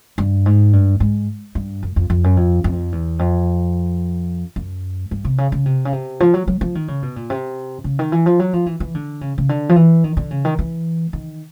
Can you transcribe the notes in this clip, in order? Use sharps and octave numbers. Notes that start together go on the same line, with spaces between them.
G2
G#2
G2
G#2
G2
F#2
F2
F2
F#2
F2
F2
E2
F2
F#2
G2
C3
C#3
C#3
C3
C#3
C3
F3
F#3
F#3
F3
D#3
C#3
B2
A#2
C3
C#3
D#3
E3
F3
F#3
F3
E3
E3
D3
C#3
C#3
D3
F3
E3
D#3
D3
C#3
D#3
E3
D#3